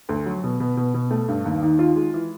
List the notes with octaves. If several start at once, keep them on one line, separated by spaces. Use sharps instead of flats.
D2
F#3
B2
B2
B2
B2
A3
G2
D#2
D#3
F4
G#3
E3